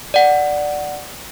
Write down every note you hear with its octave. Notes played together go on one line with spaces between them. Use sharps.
D5 F#5